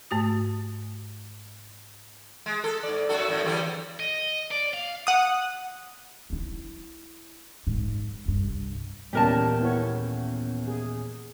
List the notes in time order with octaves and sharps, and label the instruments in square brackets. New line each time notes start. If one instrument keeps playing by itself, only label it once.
[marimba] G#2 A3 F#4 D#6
[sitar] G#3
A4
G#2 D5
F#2 F#4 A4
F#2 A2
E2 D3 G3
[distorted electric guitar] D#5
D5
F5
[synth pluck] F#5 D#6
[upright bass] D4 E4
G#2
C2 G2
[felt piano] D#1 E2 C#4 [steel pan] C#3 G3 [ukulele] G4 A#4 A5
[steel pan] B3 E4 C#5
G#4